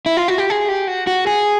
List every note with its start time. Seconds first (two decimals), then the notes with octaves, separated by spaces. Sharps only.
0.06 E4
0.17 F4
0.28 F#4
0.38 G4
0.50 G#4
0.69 G4
0.88 F#4
1.07 F#4
1.27 G#4